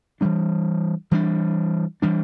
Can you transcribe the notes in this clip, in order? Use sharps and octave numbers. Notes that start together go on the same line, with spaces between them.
E3 G3 D4
E3 G3 D4
E3 G3 D4